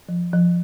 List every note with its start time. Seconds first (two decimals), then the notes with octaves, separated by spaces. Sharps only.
0.09 F3
0.33 F3